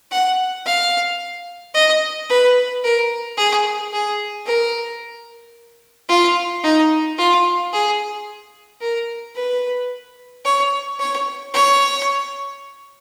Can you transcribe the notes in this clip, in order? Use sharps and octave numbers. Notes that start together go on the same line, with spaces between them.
F#5
F5
D#5
B4
A#4
G#4
G#4
A#4
F4
D#4
F4
G#4
A#4
B4
C#5
C#5
C#5